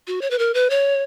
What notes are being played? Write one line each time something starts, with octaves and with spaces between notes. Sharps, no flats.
F#4
C#5
B4
A#4
B4
C#5